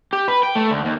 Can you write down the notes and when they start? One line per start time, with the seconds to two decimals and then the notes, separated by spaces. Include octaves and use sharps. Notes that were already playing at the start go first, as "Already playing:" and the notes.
0.13 G4
0.28 B4
0.43 G5
0.55 A3
0.70 D2
0.85 D#2